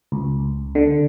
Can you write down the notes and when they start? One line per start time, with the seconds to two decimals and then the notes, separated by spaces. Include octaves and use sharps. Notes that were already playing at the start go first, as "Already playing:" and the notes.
0.12 C#2
0.75 D3